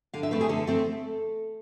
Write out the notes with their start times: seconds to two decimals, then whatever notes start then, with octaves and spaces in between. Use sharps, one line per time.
0.14 D3 F5
0.23 E5
0.31 A3 C4 B4
0.41 G#4
0.49 D3 A4
0.67 A3 C4